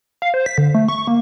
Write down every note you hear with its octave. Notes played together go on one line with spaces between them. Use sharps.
F5
C5
B6
D3
A3
C#6
A#3